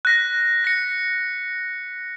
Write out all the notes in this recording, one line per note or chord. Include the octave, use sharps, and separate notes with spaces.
F#6 A#6 B6
A#6 C#7